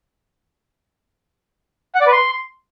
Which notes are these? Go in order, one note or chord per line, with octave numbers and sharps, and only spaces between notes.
F#5
D5
B4
C6